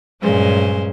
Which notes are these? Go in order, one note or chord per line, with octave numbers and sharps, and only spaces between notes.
G2 A#2 F#3 G#3 C#4 C5